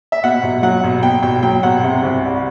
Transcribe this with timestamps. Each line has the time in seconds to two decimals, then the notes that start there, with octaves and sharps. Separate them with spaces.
0.12 E5
0.24 B2 F#5
0.43 B1
0.63 F#3 F#5
0.84 B1
1.03 B2 G5
1.23 B1 G5
1.43 F#3 G5
1.63 B1 F#5
1.83 C3
2.03 C2
2.23 G3